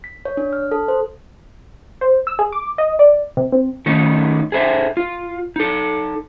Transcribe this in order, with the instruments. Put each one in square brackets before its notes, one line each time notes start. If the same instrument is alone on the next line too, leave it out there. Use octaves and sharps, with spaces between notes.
[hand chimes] B6
C#5
D4
F6
A4
C5
[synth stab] C5
E6
G#4
D6
D#5
D5
C3
C4
[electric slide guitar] D#3 A3 C#4 D#4
G#4 A4 C5 E5
F4
D#4 A4